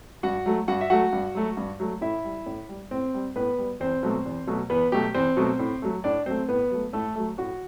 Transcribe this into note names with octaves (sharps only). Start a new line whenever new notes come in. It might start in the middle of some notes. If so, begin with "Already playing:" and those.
G2 F#4 F#5
F#3 A3
G2 F#4 F#5
E5
F#3 A3 F#4 F#5
G2
F#3 A3
G2
F#3 A3
A2 E4 E5
G3
A2
G3
A2 C4 C5
G3
A2 B3 B4
G3
E2 C4 C5
B2 F#3 A3
E2
B2 F#3 A3
E2 B3 B4
B2 F#3 A3 G4
E2 C4 C5
B2 F#3 A3
A2
F#3 A3
A2 D4 D5
F#3 A3 C4 C5
A2 B3 B4
F#3 A3
A2 A3 A4
F#3 A3
A2 F#4